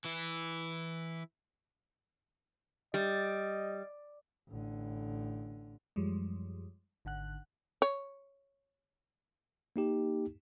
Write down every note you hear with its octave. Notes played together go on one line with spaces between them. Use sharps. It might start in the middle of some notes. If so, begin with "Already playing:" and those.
E3 E4
G3 D#5
A1 D3
F#2 F3 G3 G#3
G#1 D3 F#5 F#6
C#5
A#3 D#4 G4